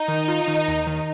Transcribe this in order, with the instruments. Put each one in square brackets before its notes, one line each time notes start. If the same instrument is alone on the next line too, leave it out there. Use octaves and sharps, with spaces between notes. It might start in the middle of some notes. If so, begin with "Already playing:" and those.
Already playing: [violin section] D#4
[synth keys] D#3
F4
D#3
D#2
D#3